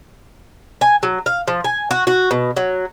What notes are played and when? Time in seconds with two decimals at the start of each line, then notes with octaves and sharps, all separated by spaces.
0.81 G#5
1.03 F#3
1.26 F5
1.47 F3
1.64 G#5
1.91 F#4
2.07 F#4
2.31 B2
2.57 F#3